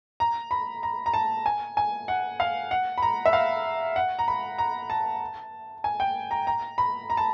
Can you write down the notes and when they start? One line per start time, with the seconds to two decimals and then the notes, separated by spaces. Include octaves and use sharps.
0.20 A#5
0.51 B5
0.83 A#5
1.06 A#5
1.14 A5
1.46 G#5
1.77 G#5
2.08 F#5
2.40 F5
2.71 F#5
2.98 B5
3.02 A#5
3.26 E5
3.33 F5
3.96 F#5
4.19 A#5
4.28 B5
4.58 A#5
4.90 A5
5.84 G#5
6.00 G5
6.31 A#5
6.47 A#5
6.78 B5
7.10 A#5
7.17 A5